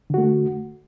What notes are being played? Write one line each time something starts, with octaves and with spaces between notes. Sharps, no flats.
D3 A3 F#4